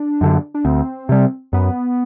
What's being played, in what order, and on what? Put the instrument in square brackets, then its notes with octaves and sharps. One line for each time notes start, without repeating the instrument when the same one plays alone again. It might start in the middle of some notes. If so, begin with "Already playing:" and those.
Already playing: [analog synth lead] D4
[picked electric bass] F#2 D3
[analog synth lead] D4
[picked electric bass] D2 [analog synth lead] C4
[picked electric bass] C3 G3
[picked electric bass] F#2 [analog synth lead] B3